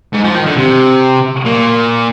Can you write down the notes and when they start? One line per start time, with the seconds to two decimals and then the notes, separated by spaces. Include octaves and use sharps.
0.13 G#2
0.25 F3
0.35 D#3
0.46 D3
0.57 C3
1.45 A#2